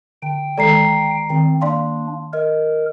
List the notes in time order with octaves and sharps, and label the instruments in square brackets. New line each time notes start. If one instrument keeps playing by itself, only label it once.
[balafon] D3 [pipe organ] G5
[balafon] D#3 G#3 A4 [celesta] D5 A#5 C7
[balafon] D#3 [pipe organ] C4
[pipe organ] A#3 D4 [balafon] D5 F5 [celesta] C6
[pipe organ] A#4 [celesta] D#5